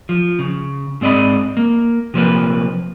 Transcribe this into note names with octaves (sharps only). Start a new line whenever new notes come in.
F3
C#3
G#2 C4 D5 D#5 B5
A#3
C3 F3 A#3 B4